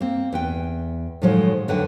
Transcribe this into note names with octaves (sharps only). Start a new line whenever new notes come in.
A#3 C4
E2 B4 G5
A2 D#3 F3 F#3 G#3
F2 D3 F#3 B4 F#5 G5